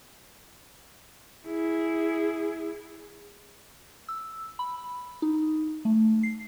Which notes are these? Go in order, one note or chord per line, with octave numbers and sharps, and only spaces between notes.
E4 G#4
E6
B5
D#4
A3
C7